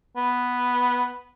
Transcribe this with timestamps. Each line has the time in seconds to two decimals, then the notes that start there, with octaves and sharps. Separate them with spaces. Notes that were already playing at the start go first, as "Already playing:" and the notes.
0.16 B3